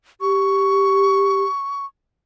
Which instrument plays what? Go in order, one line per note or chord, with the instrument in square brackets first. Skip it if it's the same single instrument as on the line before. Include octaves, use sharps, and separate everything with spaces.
[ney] G4 [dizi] C#6